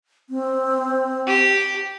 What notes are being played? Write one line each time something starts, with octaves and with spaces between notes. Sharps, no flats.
C4
G4